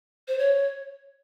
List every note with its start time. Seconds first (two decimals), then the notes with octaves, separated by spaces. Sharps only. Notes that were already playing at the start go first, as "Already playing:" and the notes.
0.28 C5
0.38 C#5